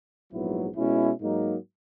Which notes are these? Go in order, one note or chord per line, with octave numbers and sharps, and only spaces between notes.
A#1 G#2 F#3 B3 E4
B2 G#3 C#4 E4
G#2 F#3 A#3 D#4